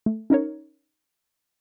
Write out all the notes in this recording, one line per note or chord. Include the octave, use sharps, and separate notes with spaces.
A3
C#4 D#4 A#4 C#5